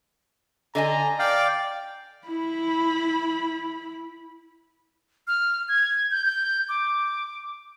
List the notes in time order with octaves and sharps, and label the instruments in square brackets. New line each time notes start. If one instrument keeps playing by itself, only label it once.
[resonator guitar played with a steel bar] D3 D#5 G#5 [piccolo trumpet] A#5
[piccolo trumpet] D5 [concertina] F5 G5
[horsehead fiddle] E4 B5
[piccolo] F6
G#6
G6
G6
D6